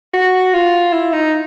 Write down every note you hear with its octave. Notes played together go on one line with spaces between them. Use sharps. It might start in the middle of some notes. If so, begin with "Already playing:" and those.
F#4
F4
E4
D#4